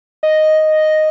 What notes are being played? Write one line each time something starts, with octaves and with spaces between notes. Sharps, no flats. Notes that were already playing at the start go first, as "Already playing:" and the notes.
D#5